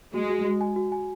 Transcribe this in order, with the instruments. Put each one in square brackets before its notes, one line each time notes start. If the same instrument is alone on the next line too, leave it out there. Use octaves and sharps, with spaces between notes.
[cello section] G#3 [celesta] F#4
[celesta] F#4
F#4
G#5
F#4
G#5